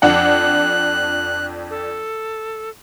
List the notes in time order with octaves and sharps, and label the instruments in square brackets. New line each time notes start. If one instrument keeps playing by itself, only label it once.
[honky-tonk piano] F2 D4 F#5 [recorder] F#6
[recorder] A4